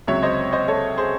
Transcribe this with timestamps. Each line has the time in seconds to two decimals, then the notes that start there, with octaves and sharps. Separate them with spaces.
0.07 C#2 C3 F#3 C#5 E5
0.22 C5 D#5
0.53 C5 D#5
0.68 A4 C#5
0.98 G#4 C5